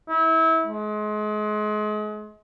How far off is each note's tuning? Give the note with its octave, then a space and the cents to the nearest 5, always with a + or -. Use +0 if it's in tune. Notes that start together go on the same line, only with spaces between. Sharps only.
E4 -25
G#3 +35